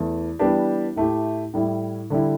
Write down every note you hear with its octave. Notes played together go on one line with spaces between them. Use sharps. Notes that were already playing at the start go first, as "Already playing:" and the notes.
Already playing: E2 E3 A3
E3 G3 B3 D4 G4
A2 A3 E4 G4
A2 G3 E4
D3 G3 E4